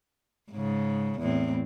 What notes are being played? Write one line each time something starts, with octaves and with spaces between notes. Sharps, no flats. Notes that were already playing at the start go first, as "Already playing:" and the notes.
G#2 C#3
E2 A2 C4